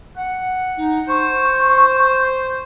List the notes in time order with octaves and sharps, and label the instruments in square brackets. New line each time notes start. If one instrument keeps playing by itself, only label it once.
[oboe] F#5
[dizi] D#4
[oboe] C5 [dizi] C#6